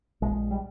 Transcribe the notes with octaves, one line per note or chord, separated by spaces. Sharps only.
A#1 G#3
G3